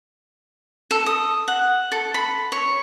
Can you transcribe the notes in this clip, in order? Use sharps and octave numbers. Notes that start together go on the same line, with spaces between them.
A4
D#6
F#5
A4
B5
C#5